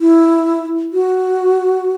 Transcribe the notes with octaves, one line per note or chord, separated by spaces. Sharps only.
E4
F#4